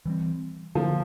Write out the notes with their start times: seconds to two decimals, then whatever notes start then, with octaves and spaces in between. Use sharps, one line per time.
0.05 E3 G3 C4
0.75 D3 F3 F#3 A#3